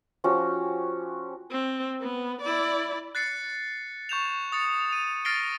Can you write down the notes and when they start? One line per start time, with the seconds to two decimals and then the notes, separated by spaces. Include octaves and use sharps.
0.24 F3 C#4 F#4 G4
1.51 C4
2.01 B3
2.42 E4 D5
3.15 F#6 A6 C7 C#7
4.09 C#6 G6 E7 F7
4.52 C#6 D#6 A6 C#7
4.93 D#7
5.25 F6 A6 A#6 C7 D7 G7